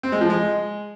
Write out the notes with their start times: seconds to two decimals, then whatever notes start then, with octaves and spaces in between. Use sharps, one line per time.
0.03 C4
0.12 G#3
0.21 F3
0.30 G#3